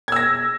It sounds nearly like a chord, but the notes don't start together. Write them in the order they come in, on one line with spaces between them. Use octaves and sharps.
G#6 E6 A#6